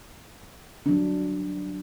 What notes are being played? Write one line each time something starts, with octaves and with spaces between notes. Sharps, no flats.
F#3 G3 D4